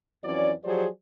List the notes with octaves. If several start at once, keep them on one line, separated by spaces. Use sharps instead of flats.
F2 E3 F#3 C#4 D5
F3 F#3 G4 G#4 C5 D5